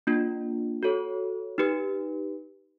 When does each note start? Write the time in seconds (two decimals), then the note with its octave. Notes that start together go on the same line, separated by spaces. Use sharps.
0.07 A#3 D4 F4
0.83 F#4 A4 C#5
1.58 D#4 G4 B4